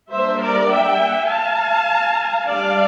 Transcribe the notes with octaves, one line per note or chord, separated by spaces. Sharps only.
G3 A#3 D4 C5 E5
A#4 D5
E5 G5
F5 A5
G3 D4 D5 F5